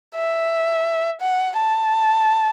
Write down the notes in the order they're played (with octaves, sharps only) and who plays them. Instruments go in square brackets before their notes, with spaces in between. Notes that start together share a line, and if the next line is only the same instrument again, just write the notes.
[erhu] E5
F#5
A5